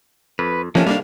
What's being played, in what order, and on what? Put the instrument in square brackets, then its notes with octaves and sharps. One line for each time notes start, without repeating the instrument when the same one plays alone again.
[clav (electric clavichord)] F2 [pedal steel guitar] B4
[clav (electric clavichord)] C3 D#3 A3 [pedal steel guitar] F3 [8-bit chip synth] A#3 C#4
[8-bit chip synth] G3 A#3 D4 [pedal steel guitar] F5